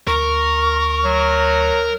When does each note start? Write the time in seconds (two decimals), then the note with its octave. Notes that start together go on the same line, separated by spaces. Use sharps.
0.07 D2 A#4 C#6
1.04 F#3